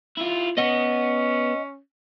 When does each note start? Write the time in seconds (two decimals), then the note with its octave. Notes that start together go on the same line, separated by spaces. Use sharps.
0.18 E4 F4
0.58 B3 C#4 D#5 F#5